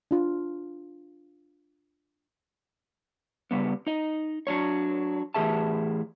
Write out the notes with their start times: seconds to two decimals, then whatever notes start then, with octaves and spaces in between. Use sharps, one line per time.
0.11 D4 F4
3.51 C#3 G3 B3
3.87 D#4 D#5
4.47 F#3 D4 C#5
5.34 A2 E3 G4 G#4 E5 A5